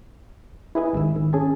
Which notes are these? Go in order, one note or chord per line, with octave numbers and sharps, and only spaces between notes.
E4 G#4 B4 D#5 G#5
G#1 G#2 D#3 E6
D#3
C#4 G#4 G#5 A5